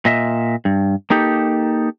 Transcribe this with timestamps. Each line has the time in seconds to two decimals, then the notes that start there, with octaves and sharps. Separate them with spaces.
0.05 A#2 D#5 E5
0.65 G2
1.10 A#3 D#4 G4 A4